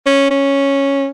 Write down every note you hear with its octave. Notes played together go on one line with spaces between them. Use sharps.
C#4
C#4